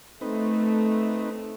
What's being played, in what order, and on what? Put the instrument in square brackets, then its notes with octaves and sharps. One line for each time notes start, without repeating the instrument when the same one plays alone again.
[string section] A3 [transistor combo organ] C4 D#4 B4